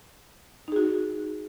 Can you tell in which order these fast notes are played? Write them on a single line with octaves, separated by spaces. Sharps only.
D#4 G#4 F#4